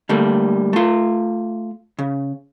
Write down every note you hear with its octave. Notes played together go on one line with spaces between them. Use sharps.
D3 G3 A3 A#3
A3 F4
C#3